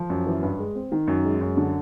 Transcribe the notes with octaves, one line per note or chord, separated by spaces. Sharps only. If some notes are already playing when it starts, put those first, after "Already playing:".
Already playing: F3
F#2
E3
G2
G#3
C4
D#3
F#2
G#3
F#2
D3